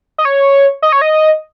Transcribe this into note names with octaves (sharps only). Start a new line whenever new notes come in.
D#5
C#5
D#5
C#5
D#5